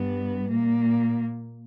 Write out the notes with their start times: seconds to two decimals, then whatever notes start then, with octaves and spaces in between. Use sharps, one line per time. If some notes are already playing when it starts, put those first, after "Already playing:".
Already playing: G2 G3 B3
0.50 A#2 A#3